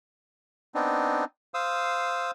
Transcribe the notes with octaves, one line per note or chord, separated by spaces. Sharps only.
B3 C4 D4 D#4
C5 F5 D#6 E6